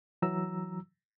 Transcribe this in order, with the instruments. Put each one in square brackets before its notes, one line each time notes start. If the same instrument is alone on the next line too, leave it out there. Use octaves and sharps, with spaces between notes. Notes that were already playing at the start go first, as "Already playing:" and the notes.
[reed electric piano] E3 F#3 A#5 E6